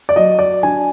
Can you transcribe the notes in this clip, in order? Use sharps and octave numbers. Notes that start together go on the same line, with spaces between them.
D5
F#3 D#5
D5
D4 G#5